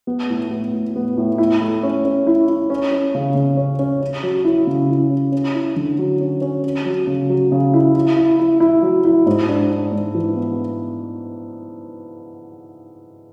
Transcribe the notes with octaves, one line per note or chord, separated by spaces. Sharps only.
B3
A2
B3
A2
B3
A2
E4
A3
C#4
C#4
E4
E4
C#4
C#4
C#3
C#3
C#4
C#4
C#4
F#3
E4
C#3
E4
C#4
C#4
E4
D3
F#3
C#4
C#4
C#4
F#3
C#3
F#3
C#3
E4
E4
E4
E4
E4
F#3
E4
G#2
D4
D4
G#2
E3
B3